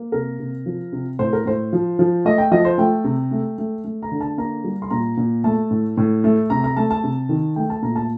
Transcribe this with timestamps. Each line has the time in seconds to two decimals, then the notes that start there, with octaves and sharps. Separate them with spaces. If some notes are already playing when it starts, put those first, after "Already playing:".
Already playing: A#3
0.12 C3 A#4
0.39 C3
0.66 F3
0.92 C3
1.19 A2 C5
1.33 A#4
1.46 A2 C5
1.73 F3
1.99 F3
2.25 A3 D#5
2.38 G5
2.51 F3 D#5
2.65 C5
2.78 A3 G5
3.04 C3
3.31 A3
3.58 A3
3.84 A3
4.03 A#5
4.11 D3
4.21 A5
4.38 A#3 A#5
4.64 G3
4.82 C6
4.90 A#2 A#5
5.17 A#2
5.44 A3 A5
5.71 A2
5.97 A2
6.24 A3
6.50 C3 A#5
6.64 A#5
6.77 A3 A5
6.90 A5
7.04 C3
7.29 D#3
7.56 A3 G5
7.70 A5
7.82 A#2 A#5
7.96 A5